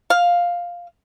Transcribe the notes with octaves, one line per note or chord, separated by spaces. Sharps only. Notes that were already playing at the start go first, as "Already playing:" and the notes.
F5